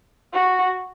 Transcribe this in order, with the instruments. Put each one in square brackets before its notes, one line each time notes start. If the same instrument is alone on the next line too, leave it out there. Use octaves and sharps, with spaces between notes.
[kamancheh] F#4